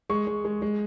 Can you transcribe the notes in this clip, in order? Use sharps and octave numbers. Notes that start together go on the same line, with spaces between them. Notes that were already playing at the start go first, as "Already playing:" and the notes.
G#3 C#6
G#3
G#3
G#3